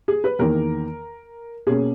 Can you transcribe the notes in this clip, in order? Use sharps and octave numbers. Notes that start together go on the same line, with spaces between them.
G#4
B4
E2 D#3 A#3 A#4
B2 A#3 C#4 G#4